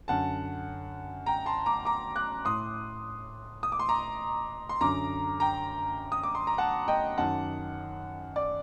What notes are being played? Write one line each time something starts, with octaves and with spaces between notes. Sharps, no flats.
F#2 D3 F#5 A5
G5 A#5
A5 C6
A#5 D6
A#5 D6
D6 F#6
A2 C6 D#6
D#6
D6
C6
A#5 D6
C6
F#2 D3 A#5 D6
G5 A#5
D#6
D6
C6
A#5
F#5 A5
D#5 G5
F#2 D#3 F#5 A5
D5